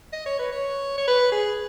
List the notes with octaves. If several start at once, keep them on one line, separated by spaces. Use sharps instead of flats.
D#5
C#5
B4
C#5
C#5
B4
G#4